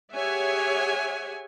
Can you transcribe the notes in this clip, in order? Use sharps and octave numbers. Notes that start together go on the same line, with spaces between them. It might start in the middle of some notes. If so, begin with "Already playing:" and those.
G4 G#4 C#5 E5 F#5 G#5